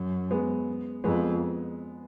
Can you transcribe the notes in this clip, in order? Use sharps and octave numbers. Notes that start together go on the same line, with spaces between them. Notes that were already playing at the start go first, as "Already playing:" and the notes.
Already playing: F#2
G#3 B3
F2 G#3 B3